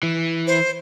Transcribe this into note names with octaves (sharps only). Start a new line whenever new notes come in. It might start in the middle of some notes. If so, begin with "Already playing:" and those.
E3
C5